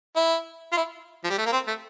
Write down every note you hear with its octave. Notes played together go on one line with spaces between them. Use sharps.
E4
F4
E4
F3
G3
A3
A#3
C4
A3